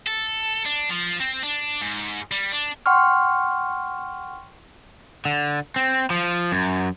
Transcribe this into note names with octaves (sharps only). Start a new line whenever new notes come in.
A4
D4
F3
C4
D4
G#2
G3
D4
F#5 G5 C6 C#6 F6
D3
C4
F3
F#2